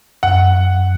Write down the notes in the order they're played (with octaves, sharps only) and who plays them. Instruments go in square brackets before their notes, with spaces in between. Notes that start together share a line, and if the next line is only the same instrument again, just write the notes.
[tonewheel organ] F#2 [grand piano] F#5